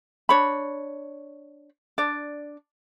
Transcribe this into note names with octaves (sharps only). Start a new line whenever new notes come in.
D4 C#5 B5
D4 D5